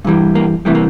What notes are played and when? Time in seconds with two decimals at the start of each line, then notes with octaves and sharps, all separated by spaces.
0.04 G2 E3 G3
0.35 A#3
0.65 C3 E3 G3 A3
0.75 A#3